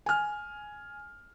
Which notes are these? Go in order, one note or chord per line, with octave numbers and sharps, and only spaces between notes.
G#5 F6